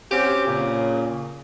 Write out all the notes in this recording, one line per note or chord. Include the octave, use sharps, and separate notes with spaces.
C4 C#4 F#4 G4
A#2 C#3